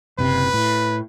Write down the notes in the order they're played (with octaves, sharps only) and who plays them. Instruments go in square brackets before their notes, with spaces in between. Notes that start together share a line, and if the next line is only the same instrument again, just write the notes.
[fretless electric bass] F#1 C3 [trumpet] B4
[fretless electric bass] A2